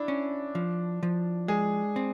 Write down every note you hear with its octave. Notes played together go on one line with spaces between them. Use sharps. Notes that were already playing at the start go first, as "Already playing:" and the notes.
Already playing: D4 E4
C#4
F3
F3
G#3 G#4
C4